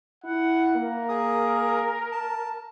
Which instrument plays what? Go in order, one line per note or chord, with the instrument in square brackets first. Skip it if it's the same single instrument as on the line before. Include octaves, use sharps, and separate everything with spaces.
[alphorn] E4 [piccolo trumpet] F#5
[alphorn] A#3 [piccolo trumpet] A#4
[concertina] G#4 D#6
A5